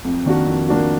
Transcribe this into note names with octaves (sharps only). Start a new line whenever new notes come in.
F2
D#3 A#3 D4 F#4
F2
D#3 A#3 D4 F#4